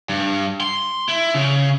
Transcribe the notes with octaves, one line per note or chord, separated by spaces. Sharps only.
G2
C6
E4
C#3